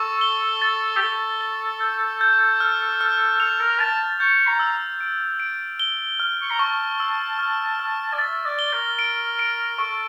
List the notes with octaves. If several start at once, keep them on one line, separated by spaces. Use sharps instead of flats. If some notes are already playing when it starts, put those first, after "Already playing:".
Already playing: A4 C#6
G7
A6
G4
A4 G7
G7
G6
G6
F6
F6
A4 F7
A#4
A5 A6
C#6 G6
A#5
E6
D7
D7
G7
F6
C#6
A#5
A5 C#6
E6
F6
F6
D5
E5 A6
D5
G7
A#4
D7
D7
A4 C#6